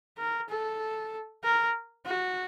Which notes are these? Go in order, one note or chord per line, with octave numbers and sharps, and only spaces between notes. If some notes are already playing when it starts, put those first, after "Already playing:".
A#4
A4
A#4
F#4